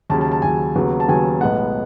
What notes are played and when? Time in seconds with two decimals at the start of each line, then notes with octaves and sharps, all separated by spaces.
0.10 D#2 C#3 F#3 A5
0.21 A5
0.32 A5
0.42 D#2 C#3 F#3 G#5
0.76 D#2 C#3 F#3 B3
1.00 A5
1.08 D#2 C#3 F#3 B3 G#5
1.41 B1 A2 G#3 B3 F#5